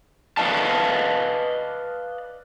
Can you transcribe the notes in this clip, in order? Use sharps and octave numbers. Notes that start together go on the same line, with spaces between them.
B4 D5 D#5 F5 A5